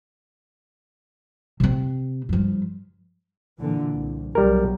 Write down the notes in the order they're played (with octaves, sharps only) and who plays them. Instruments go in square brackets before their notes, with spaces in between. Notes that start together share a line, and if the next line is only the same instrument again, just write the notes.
[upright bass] C3 C4
G2 F3
[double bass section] A#2 D3 E3
C2
[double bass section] B1 [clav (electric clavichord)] G3 A#4